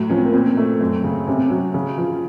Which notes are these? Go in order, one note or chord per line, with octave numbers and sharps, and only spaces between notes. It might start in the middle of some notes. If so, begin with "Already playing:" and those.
Already playing: A2 F#3
F3 C#4
C4
A#3
A#2 C4
A3
F#2
C#3
C3 C#4
C4
F#3 C#4
C#3
F3